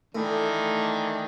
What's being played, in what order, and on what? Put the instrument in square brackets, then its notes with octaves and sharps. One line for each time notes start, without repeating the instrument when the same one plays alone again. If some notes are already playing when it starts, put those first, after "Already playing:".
[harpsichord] A2 [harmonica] D#3 E3 D4